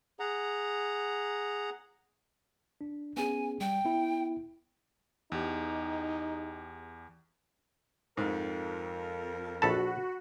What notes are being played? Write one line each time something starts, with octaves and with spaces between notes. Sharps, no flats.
G#4 F#5 A#5
D4
B3 C#4 G#4 G#5
G3 G5
B3 E4
E2 D#4 G4
F2 G#2 A#4
A#1 F#4 A4 A5 B5